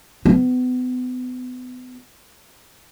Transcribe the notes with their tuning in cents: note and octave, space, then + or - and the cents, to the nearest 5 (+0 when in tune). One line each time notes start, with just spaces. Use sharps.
B3 +35